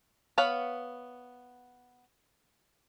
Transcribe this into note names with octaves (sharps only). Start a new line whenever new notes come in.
B3 C#5 F5 F#5 B5